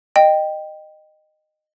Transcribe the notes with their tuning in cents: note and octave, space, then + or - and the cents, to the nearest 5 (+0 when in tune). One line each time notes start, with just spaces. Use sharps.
D#5 -15 G5 +0